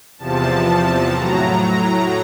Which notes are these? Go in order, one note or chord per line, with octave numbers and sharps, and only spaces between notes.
E2 C3 F3 A5
A2 F#3 A#5